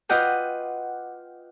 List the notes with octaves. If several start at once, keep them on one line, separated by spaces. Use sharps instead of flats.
F4 B4 D#5 F#5 G5 D6